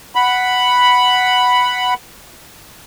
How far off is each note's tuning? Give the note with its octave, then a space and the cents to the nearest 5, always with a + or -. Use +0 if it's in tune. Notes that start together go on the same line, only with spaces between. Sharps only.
F#5 +0 B5 +0